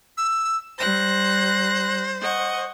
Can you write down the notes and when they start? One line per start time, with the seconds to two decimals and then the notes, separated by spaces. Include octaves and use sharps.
0.17 E6
0.78 G3 C5 F#6 A#6
2.21 D#5 F#5 C#6